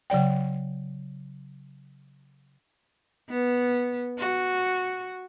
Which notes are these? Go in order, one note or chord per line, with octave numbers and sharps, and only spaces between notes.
C#3 F#3 D5 G5
B3
F#4